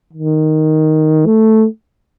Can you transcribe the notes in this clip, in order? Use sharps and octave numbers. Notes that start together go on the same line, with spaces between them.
D#3
A3